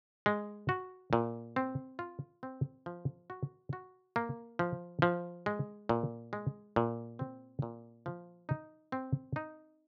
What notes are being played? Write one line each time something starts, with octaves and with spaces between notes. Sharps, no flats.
G#3
F#4
A#2
C4
F4
C4
F3
F#4
F#4
A#3
F3
F3
G#3
A#2
G#3
A#2
C4
A#2
F3
D#4
C4
D#4